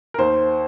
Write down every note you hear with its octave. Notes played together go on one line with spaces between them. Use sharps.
A#4
D#2 C5